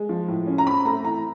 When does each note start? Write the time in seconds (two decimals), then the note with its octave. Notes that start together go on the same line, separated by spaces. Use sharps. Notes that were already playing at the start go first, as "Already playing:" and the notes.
Already playing: G#3
0.09 F3
0.28 A2
0.47 C#4
0.58 A#5
0.66 C4 B5
0.85 A3 A#5
1.04 E3 A#5